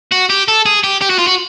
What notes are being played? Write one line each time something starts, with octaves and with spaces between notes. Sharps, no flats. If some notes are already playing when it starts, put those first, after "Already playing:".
F#4
G4
A4
G#4
G4
G4
F#4
F4
F#4